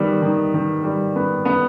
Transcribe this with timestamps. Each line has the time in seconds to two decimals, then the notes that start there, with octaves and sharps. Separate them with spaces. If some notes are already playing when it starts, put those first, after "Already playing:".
Already playing: D#3 G3 B3
0.22 D#3
0.54 D#3
0.84 G3
1.16 B3
1.45 B3